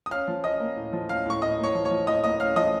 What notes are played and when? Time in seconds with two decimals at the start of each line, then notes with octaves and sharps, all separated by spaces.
0.06 D#6
0.11 C#4 F5 F6
0.28 F3
0.44 C#4 D#5 D#6
0.60 A#3
0.77 A2
0.93 F3
1.09 C#4 F5 F6
1.26 A2 C#6
1.42 A2 D#5 D#6
1.58 A#3
1.64 C#5 C#6
1.75 F3
1.85 C#5 C#6
1.91 F3
2.07 A2 D#5 D#6
2.23 A#3 D#5 D#6
2.40 C#4 F5 F6
2.56 F3 D#5 D#6